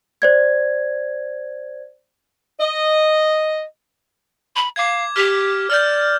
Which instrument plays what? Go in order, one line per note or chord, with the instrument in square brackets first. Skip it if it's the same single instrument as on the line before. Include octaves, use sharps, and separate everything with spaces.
[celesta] C5 D5 G#6
[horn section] D#5
[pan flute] B5
[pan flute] F5 [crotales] D6 G#6
[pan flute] G4 [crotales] F6
[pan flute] D5 [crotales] F6 G6